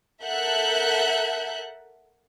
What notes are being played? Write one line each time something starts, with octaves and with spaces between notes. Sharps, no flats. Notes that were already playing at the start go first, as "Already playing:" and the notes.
A4 A#4 E5 F#5 F#6 G6